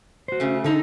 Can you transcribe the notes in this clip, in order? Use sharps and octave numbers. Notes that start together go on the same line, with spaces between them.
F#4 C5
C#3 A3
D3 D#4 A4